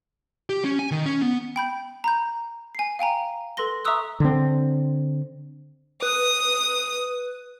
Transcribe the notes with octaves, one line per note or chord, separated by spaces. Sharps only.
G4
C#4
G#5
D#3
C#4
B3
G5 B5 G6
A#5 B5 G6
G#5 C7
F5 G5 G#5 A#5
A4 B4 C6 A#6 G7
E5 A#5 C#6 D#6 E6 F#6
D3 C4
B4 D#6